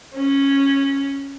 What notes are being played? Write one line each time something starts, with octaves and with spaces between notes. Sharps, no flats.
C#4